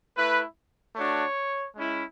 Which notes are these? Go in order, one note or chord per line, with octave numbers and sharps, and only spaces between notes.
A3 E4 B4
A3 D4 F#4 C#5
G#3 C#4 E4